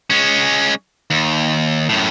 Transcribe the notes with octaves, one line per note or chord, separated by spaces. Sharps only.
G#3 C#4
D#2
F#2 A2